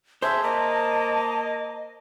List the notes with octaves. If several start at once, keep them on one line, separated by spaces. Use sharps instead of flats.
G#4 C5 E5 A5
A#3 D#5